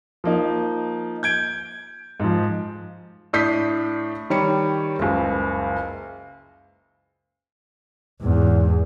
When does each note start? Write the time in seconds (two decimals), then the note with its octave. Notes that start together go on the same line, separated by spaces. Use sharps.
0.24 F3 A#3 D#4
1.23 G6 G#6 D7
2.20 G#2 F3
3.33 A2 D4 D#6 G6 B6 C7
4.30 D#3 G3 C#5 B5 C#7
4.99 F#1 C#2
8.21 E2 G#2